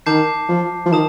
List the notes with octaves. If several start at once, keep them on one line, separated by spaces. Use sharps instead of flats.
D#3 A5 D6 G6 C7
F3
F3
D#3 A5 D#6